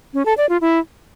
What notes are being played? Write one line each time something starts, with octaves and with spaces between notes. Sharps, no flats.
C#4
A4
D5
F4
E4